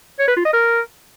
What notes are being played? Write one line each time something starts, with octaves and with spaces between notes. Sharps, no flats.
C#5
B4
F4
D#5
A#4